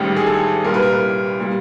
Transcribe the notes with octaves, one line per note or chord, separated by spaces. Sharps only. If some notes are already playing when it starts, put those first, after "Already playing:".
Already playing: A1 G#2 D#3 G3
G#4
A4
C2 A#2 G3 A#4
B4
A#4
B4
A#2 G3